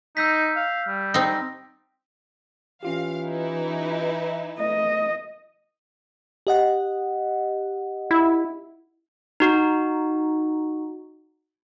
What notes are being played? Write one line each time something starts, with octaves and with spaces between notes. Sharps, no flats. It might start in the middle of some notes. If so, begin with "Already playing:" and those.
D#4 E6 G6 B6
F5
G3
C4 D#4 A#6
E3 C#4 F4 G4 F5
D#4 E4 B4
A3 D#5
G4 D#5 F#5
E4
D#4 F#4